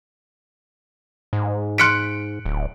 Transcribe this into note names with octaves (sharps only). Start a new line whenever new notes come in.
G#2
C6 F6 F#6 B6 C#7 D7
D1